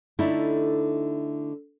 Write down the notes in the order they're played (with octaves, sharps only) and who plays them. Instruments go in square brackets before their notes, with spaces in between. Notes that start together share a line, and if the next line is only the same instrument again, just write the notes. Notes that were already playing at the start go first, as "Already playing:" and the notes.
[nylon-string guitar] D3 A3 D#4 E4